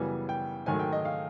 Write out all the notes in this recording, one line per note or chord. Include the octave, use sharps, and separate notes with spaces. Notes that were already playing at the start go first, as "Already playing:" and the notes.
Already playing: F#2 C#3 E3 G3 B3 G#5
G5
G#2 D#3 F#3 A3 G#5
G5
D#5
F5